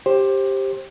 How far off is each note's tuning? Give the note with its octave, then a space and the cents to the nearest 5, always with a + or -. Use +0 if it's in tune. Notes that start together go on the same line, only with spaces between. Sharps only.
G4 +0 C5 +20